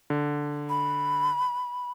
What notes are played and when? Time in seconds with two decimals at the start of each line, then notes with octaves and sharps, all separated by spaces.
0.10 D3
0.69 B5